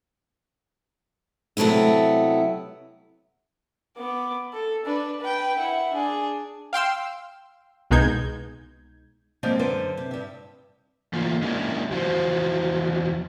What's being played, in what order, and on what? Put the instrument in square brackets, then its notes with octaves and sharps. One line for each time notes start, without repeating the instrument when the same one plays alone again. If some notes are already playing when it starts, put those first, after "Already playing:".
[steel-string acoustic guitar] C3 F#3 A3 B3 E4
[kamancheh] B3 D6
A4
D4 B4
B4 G5
E4 F#5
D4 G#4
[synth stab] F5 G5 C6 E6
C2 B2 G#3 D#4 G6 G#6
[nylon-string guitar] F3 G3 G#3 A#3 C4 G4
F#2 D3 B4 C5
C3
G2 E5
[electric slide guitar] E3 A3 A#3 F4
G#3 A#3 C#4 D4 E4 G4
E2 E3 F3 F4 F#4 C5